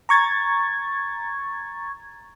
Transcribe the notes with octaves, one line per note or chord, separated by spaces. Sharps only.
A#5 C#6 G#6 A6